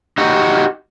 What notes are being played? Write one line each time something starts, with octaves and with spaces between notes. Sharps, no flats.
D#4 F#4 G4